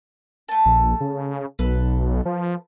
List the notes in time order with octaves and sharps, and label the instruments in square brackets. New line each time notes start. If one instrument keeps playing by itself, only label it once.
[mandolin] A3 A5
[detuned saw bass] A#1
C#3
[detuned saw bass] B1 [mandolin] A4 B4
[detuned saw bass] F3